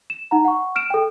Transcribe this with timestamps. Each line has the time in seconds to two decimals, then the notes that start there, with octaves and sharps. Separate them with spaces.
0.10 E7
0.31 D#4 F#5 A#5
0.45 F#5 C#6
0.76 F6 D7 E7
0.90 A4 G5